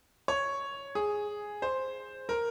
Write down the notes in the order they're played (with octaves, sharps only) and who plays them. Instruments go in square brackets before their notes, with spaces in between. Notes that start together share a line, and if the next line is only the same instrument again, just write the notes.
[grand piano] C#5
G#4
C5
A#4